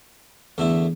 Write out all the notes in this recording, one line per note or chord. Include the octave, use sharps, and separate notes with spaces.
E2 D3 A3 E4